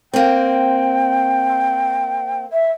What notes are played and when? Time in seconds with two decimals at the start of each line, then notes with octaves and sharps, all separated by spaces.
0.14 A#3 C4 G5
2.53 E5